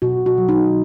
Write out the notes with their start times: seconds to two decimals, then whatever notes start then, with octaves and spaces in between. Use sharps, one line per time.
0.02 B2 F#4
0.26 F#4
0.38 F#3
0.49 D#4